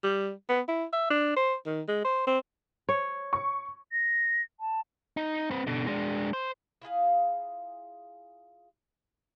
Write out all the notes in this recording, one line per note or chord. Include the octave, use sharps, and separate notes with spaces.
G3
B3
E4
E5
D4
C5
D#3
G#3
C5
C4
C#5
C#6
A#6
A5
D#4
C4 B4
B2 D3
G#3 D4
C5
E4 F4 G#4 F5